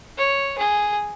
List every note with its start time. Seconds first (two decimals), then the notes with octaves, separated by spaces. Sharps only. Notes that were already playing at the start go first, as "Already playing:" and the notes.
0.18 C#5
0.58 G#4